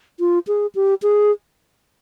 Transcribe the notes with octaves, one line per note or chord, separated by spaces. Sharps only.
F4
G#4
G4
G#4